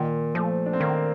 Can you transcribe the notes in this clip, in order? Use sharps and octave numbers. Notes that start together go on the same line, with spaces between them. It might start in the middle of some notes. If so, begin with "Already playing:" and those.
Already playing: A#2 D#3
F3 A3
D4
C4
D#3 A#3